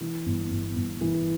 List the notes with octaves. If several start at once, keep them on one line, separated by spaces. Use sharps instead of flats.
E3
G1
G1
G1
E3